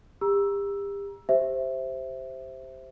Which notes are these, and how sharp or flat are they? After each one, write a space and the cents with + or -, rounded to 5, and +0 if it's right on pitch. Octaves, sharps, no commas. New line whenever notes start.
G4 +35 A#5 +25 E6 +5
G4 +0 C5 +0 E5 +0